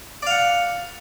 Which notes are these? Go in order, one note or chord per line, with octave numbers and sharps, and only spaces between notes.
D5 F5 F#5